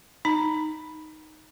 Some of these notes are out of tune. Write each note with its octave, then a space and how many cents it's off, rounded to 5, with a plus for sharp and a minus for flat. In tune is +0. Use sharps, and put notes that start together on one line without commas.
D#4 +0 A#5 +0